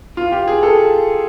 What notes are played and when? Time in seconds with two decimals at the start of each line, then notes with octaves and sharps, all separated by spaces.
0.17 F4
0.32 G4
0.48 G#4
0.63 A4